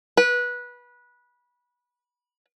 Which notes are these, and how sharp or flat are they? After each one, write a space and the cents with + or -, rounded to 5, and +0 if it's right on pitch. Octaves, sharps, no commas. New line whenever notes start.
B4 -20